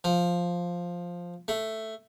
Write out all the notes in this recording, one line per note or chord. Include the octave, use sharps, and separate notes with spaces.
F3
A3